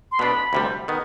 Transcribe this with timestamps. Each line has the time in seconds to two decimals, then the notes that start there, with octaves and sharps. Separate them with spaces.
0.12 C6
0.19 B2 B3 D4 B5
0.53 D2 C3 G3
0.88 D#3 B3